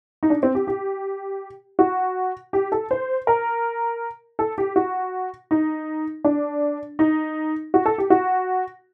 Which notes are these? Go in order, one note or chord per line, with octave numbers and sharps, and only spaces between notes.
D#4
D4
C4
G4
G4
F#4
G4
A4
C5
A#4
A4
G4
F#4
D#4
D4
D#4
F#4
A4
G4
F#4